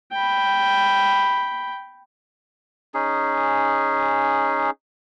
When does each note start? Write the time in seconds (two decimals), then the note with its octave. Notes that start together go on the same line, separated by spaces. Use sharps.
0.12 G5 B5
2.94 C#4 D#4 G#4